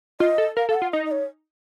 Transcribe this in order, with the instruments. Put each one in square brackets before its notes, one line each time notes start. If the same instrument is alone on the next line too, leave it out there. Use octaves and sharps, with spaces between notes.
[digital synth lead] F4 [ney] D#5
[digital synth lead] A4
[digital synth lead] A#4 [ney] F5
[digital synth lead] A4 [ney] F5
[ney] F#5
[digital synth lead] F4
[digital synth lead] D#4 [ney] D#5
[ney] D#5
C#5